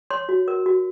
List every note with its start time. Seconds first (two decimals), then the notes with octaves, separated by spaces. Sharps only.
0.10 C#5 C6
0.29 F#4
0.48 A#4
0.66 F#4